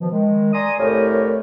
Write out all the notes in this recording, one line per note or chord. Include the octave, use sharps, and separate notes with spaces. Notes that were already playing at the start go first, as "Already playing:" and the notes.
B2 D#3 F3
D#3 G#3
D5 G#5 A#5 C6 D#6
C2 A2 A3 G4 A#4 C#5